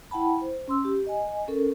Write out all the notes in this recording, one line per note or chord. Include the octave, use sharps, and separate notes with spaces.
E4 F#5 G5 A5 B5
C5
C#4 C6 E6
G4
D#5 G#5
C#4 A4 A#4